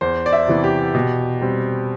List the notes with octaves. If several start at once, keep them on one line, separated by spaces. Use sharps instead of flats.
E2 C5
D5
E5
C3 E3 B3
G4
B2
G3 C4